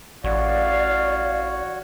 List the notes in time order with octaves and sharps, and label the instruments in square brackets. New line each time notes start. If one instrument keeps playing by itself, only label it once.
[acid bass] A1 [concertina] F#4 C#5 [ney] D5 [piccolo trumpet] F5